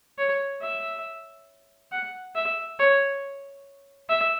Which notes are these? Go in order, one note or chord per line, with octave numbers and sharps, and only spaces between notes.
C#5
E5
F#5
E5
C#5
E5